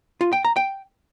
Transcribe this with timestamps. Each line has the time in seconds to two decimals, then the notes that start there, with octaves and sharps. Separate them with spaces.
0.21 F4
0.33 G5
0.45 A#5
0.56 G5